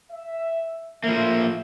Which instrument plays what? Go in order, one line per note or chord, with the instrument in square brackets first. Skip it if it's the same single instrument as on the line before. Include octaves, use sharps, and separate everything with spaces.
[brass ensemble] E5
[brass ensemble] A2 E5 [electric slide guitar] F3 A#3